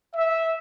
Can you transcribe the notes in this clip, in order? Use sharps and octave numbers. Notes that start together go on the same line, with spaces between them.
E5